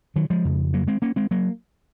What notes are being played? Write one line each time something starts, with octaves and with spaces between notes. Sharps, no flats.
D#3 F#3
F3 G#3
F2 C#3
F#3 A#3
G#3 C4
A#3 C#4
G#3 C4
F#3 A#3